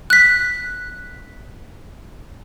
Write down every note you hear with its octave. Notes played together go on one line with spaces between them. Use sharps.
F#6 B6